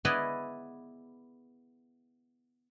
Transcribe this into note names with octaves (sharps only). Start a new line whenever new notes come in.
B3 E4 G#4 B4 D5 D#5